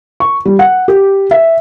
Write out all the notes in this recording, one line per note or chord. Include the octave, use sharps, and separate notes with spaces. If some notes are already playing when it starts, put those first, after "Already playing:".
C#6
G3
F#5
G4
E5